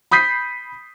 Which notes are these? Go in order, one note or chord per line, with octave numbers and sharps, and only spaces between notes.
B5 D#6 G6 B6 C7